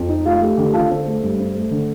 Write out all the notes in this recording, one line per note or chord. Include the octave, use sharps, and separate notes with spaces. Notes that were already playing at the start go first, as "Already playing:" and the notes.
Already playing: F2
D#4
A3 F4
A3 G4
D3 G4
D3 F4 A4
C4
A3
G2
C4
A3
D3